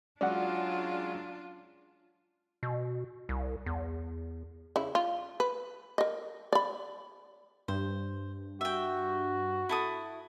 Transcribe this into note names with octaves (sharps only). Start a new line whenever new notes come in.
F#3 G#3 C#4 D4 F4 D5 F#5
B2
C2
E2
C#3 E4
F4
B4
A#4 D#5
D5 B5
G2 C5
F#4 E5 G5
E4 A4 D#6